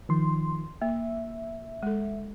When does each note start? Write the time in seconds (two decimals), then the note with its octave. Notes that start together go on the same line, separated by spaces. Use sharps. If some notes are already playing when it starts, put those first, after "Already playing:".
0.09 D#3 F3 C6
0.82 A#3 E5
1.83 G#3 A4